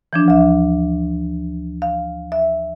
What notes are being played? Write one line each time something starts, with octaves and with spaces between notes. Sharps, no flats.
E3 F3 D4
D2 E5
F5
E5